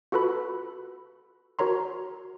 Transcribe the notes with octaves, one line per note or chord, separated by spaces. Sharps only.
F4 F#4 A4 B4 B5
F#4 A#4 C#5 A#5 C6